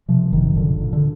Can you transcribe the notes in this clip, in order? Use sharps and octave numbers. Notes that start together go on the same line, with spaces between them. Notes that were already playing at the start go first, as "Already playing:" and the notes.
C3 F3
F#1 D#3
A#2 D3
A#2
D3